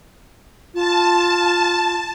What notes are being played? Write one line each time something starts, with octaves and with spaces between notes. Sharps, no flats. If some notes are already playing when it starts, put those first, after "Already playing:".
F4 A5